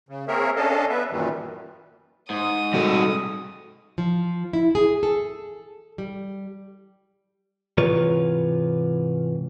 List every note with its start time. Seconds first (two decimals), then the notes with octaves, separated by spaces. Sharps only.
0.09 C#3
0.28 A#3 C4 G#4 A#4 C#5 E5
0.56 C#4 D4 A4 D#5 F5 A5
0.90 B3 B4 E5
1.12 F#2 A#2 D#3 E3 G3
2.30 G#2 D#6
2.74 G3 F#4 A4
3.98 F3
4.53 E4
4.75 G#4
5.03 A4
5.98 G3
7.77 G#2 C3 E3 F4 B4 C#5